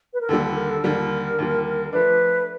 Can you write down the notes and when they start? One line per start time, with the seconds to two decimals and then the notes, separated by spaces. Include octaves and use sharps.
0.14 B4
0.21 A#4
0.29 D#2 D3 G3 A4
0.43 A4
0.56 A#4
0.70 A4
0.83 D#2 D3 G3 A#4
1.39 D#2 D3 G3
1.93 F3 A3 D4 B4